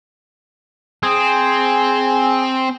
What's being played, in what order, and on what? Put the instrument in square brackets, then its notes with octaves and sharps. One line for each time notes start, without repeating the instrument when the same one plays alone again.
[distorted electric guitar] C4 [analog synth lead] G#4